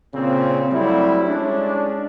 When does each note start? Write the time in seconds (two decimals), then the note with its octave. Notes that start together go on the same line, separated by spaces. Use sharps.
0.13 A#2 C#3 C4
0.71 F#3 G3 A3 C4 E4
1.26 G#3 C#4 D4